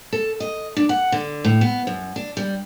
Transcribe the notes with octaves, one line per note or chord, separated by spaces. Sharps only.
A4
D#5
D4
F#5
D3
A2
B3
F#2
D4
G3